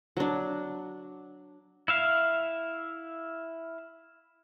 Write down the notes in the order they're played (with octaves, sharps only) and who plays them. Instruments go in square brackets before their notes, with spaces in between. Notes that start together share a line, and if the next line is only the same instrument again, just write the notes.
[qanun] F#3 D4
[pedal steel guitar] E4 E5 F5